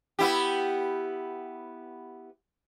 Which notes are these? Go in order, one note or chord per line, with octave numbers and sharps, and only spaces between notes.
B3 E4 G4